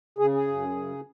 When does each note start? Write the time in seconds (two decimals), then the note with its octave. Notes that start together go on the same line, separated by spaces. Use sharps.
0.18 C#3 G#4
0.34 G#4
0.47 F#2
0.76 C#3